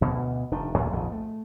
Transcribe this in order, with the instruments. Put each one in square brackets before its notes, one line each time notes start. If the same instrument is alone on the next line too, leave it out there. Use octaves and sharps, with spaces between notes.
[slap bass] D2 B2
F1 D#3 D4
D2 A#2 D3 G#3
A#1 F2 G#2 D#3
A3